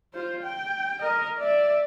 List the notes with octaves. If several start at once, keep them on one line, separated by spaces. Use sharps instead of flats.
F4 C5
G5
A#4 D#5
D5 E5